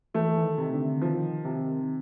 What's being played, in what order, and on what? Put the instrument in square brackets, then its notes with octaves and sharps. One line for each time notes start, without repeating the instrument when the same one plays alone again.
[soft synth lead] E3 [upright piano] A3
[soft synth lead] E3
D#3
[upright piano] C3
[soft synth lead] D3
[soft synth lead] D#3 [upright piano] F3
[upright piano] C3